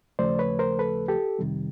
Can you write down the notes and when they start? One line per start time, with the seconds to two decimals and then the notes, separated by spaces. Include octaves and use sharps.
0.19 D#2 C#3 F3 A3 C5 D5
0.39 B4 C#5
0.59 A#4 C5
0.79 A4 B4
1.08 G4 A4
1.39 F2 C3 D#3 G3